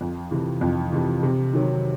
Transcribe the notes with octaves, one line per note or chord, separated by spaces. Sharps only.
F2
C3 E3
F2
C3 E3
C3
D#3 F#3